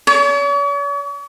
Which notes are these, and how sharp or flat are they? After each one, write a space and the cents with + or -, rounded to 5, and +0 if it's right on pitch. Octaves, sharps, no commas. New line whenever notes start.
C#5 +45